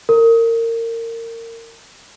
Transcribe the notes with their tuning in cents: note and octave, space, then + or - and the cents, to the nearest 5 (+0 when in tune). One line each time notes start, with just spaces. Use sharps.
A#4 -25